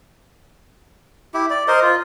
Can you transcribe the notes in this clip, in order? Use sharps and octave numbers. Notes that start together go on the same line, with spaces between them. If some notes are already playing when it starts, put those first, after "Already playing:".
E4 G4
D5
A#4 C5 D#5
F4